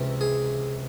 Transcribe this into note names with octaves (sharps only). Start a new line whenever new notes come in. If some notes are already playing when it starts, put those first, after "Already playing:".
Already playing: C#2 C3 E3
G#4